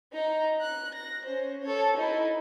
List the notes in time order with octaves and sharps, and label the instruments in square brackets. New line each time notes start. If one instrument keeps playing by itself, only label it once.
[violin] D#4 A#5
F#6
A#6
C#4 C5
A4 C#5
D#4 E4